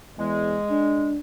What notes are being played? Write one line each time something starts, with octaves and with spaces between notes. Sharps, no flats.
E2 G#3
D4